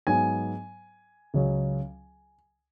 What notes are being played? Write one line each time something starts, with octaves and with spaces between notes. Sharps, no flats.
G#2 F#3 B3 G#5
C#2 C#3 F#3